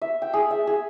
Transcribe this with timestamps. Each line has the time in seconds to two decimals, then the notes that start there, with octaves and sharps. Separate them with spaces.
0.02 E5
0.22 G5
0.34 G#4
0.51 E5
0.67 G#4